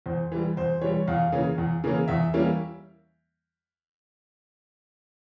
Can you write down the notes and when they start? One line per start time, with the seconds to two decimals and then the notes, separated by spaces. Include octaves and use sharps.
0.06 E2 C5
0.32 E3 G3
0.57 E2 C5
0.81 E3 G3 C#5
1.08 E2 F5
1.32 C#3 E3 A#3 C#4
1.58 E2
1.84 C#3 E3 A#3 C#4
2.08 E2 E5
2.34 E3 G3 A#3 C#4